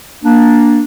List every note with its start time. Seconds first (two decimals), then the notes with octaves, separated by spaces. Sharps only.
0.24 A#3 D4